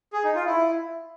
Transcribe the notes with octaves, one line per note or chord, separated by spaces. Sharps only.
G#4
D#4
F4
E4